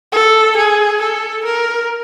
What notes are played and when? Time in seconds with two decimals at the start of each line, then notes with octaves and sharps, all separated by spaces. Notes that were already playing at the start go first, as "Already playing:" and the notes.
0.12 A4
0.57 G#4
1.01 A4
1.45 A#4